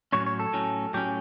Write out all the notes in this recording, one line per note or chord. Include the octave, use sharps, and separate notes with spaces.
A2 F#3 C#4 C#5
C#5
A4
A2 F#3 C#4
A2 F#3 C#4 G4